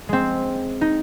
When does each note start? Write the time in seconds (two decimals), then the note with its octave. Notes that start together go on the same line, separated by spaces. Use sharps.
0.09 G#3 C4
0.81 D#4